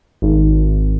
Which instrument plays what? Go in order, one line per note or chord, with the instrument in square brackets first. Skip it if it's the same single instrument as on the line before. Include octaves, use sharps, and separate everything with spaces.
[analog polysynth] G#1